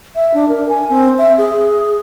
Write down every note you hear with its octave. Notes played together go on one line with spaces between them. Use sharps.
E5
D4
A#4
G#5
C4
E5
G#4